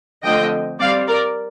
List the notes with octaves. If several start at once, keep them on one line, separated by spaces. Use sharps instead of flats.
D3 F3 A3 C4 D#5 G5
G3 C4 D5 F5
A#4 D5